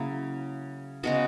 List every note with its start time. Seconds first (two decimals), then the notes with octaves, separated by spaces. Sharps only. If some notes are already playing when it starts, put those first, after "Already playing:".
Already playing: C#3 F#3 A#3 E4
1.03 C#3 G#3 B3 F#4